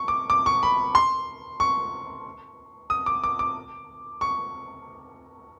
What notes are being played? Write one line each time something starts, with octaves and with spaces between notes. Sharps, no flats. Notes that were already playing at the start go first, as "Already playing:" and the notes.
Already playing: C#6
D6
D6
C#6
B5
C6
C#6
D#6
D6
D6
D6
C#6